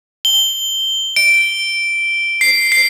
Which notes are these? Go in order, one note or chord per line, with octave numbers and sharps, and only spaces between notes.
G7
D7
C7
C7